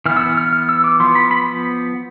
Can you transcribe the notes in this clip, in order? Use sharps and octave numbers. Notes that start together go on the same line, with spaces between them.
E3 B3 F6
E6
F6
F6
F6
E6
D6
F3 B3 C6
B5
B5